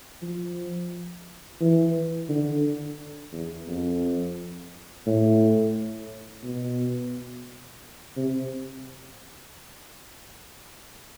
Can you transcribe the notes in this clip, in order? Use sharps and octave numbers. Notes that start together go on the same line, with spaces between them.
F3
E3
D3
E2
F2
A2
B2
C3